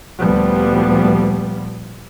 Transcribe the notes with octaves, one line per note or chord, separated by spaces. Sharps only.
D2 A#2 F3 G3 B3